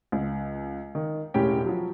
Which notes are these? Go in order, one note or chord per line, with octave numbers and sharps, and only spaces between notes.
C#2
D#3
E1 A2 C#4 G4 G5
F3 F#3